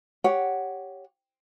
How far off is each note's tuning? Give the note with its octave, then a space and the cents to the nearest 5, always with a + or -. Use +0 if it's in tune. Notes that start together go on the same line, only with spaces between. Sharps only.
G4 +0 C#5 +0 F#5 +0